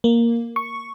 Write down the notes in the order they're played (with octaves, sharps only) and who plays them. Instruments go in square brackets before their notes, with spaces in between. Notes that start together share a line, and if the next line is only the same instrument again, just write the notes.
[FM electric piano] A#3
C#6